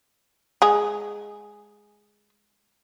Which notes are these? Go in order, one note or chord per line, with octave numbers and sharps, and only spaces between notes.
G#3 G#4